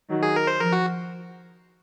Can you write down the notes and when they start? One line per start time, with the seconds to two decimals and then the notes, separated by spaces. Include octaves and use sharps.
0.10 D#3 F#3
0.23 G#4
0.36 A#4
0.47 C5
0.60 F3 A#4
0.73 F#4